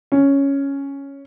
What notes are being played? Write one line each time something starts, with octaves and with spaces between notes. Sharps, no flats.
C#4